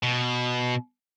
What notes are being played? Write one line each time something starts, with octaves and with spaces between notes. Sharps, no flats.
B2